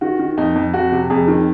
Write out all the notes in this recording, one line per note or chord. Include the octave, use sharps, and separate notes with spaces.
D#3 F#4
D#3
F2 D#4
F2
F2 F#4
C3
F2 G#4
D#3